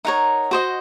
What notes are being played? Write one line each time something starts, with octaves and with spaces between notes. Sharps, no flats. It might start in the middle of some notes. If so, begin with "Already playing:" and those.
D#4 A#4 C#5 F#5
F#4 C5 D#5